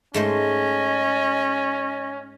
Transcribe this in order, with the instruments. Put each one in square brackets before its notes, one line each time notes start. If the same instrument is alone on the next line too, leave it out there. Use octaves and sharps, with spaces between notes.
[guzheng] G#2 A3 C5 [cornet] C#4 [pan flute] D#5